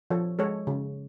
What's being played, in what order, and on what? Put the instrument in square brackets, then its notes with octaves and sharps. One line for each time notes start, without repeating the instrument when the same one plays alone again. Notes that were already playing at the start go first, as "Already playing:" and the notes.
[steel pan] F3 A4 C#5
G#3 A4 C#5
C#3